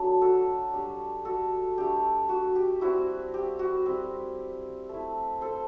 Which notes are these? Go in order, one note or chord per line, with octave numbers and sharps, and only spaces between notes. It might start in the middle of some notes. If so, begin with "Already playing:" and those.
Already playing: F#3 A3 D4
F#4 A4
G3 D4
F#4 A4
A3 D4 G4
F#4
G4
G3 C4 E4 F#4
G4
F#4
G3 C4 E4
A3 E4
A4 C5